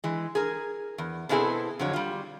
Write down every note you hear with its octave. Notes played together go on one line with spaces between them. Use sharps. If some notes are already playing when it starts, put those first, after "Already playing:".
E3 G#3
G#4 A#4
E2
B2 B3 C4 E4 G#4 A4
F2 D3 F#3 C#5
G3 F4